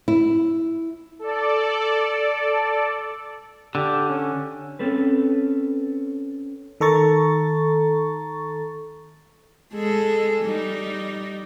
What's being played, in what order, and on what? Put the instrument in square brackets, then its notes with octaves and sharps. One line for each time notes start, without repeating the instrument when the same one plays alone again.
[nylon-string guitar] E4
[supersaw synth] A4 D5
[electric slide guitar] D3 [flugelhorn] G4
[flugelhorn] C#4
[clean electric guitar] C4 C#4 A4 B4
[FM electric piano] D#3 A4 A#5 C#6 A6
[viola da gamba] G#3 G#4 A4
G3 D#4